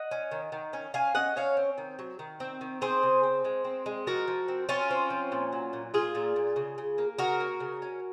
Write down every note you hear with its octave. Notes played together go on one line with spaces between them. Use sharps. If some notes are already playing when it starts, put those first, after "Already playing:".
Already playing: D#5 F#5
C#4
D#3
D#3
C#4
C#4 F5 G#5
C#4 D#5 F#5
C#4 C#5 F5
C4
D#3
F#3
D#3
C4
D#3
C4 G#4 C5
C#3
C4
G#3
C4
G#3
F3 F#4 A#4
F3
C4
C4 C#4 F4
C4
F3
A#2
F#3
A#2
A#2 F4 G#4
A#2
A#2
C#3
C#3
A#3
C#3 F#4 A#4
A#3
C#3
C#4